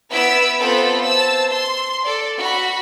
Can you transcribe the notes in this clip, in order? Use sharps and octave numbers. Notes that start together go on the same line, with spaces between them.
B3 E4 B4 E6 B6 D7
B3 C4 F4 A4 C5 B5
C5 A5 E6
C6
A4 D5
F#4 B5